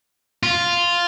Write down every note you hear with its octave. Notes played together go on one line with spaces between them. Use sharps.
F4